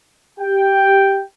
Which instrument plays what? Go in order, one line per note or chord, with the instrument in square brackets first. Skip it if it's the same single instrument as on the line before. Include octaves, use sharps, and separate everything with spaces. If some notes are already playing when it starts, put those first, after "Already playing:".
[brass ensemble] G4 G5